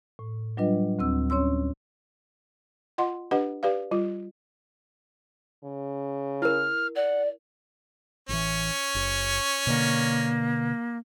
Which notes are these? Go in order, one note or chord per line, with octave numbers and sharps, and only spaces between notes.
A2
F#3 G3 D4 F4 B4 D#5
D2 C4 E6
C#4 C#5 C6 E6
F4 D#5 F#5 C6
D4 G4 B4 D#5 F#5
G4 B4 D5 F5
G3 F4
C#3
E4 A#4 F6
D5 F#5
A1 E3 C#4 C#6
F#1
B2 D3 A#3